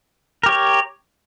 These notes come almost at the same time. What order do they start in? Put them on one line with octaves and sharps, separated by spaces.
A#4 G4 C#5